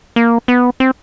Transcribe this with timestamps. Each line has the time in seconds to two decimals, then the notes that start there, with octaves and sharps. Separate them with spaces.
0.16 A#3
0.48 B3
0.80 C4